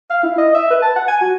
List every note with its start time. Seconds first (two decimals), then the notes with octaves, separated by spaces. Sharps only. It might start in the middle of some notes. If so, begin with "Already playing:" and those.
0.10 F5
0.23 E4
0.38 D#5
0.55 E5
0.70 B4
0.82 A5
0.96 F#5
1.08 G#5
1.21 F#4